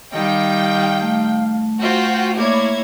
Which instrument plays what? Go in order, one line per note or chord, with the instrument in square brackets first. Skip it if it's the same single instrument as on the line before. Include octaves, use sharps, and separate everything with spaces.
[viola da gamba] D#3 G3 [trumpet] F5 [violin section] G5
[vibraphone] A3
[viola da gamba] F4 [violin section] F#4 C5 G5
[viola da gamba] A#3 C#5 [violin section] E4 G#6 [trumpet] D5